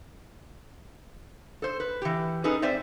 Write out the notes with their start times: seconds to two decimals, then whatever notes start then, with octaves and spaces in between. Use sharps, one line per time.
1.62 A4 C5
1.80 B4
2.02 E3 G4
2.44 C#4 D#4 G#4 A4 B4
2.62 C4 C5 D5 E5